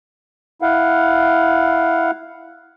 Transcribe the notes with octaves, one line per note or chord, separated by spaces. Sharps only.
E4 F5 F#5